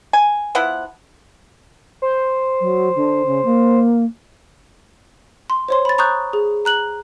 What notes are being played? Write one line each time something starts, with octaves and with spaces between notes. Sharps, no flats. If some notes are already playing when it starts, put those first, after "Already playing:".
G#5
F3 B3 E4 F#5
C5
F#3
D3
C#3
A#3
C6
C5 C#5 C6
B5 A6
A#5 C#6 D#6 F#6 G6
G#4
A#5 F#6 F#7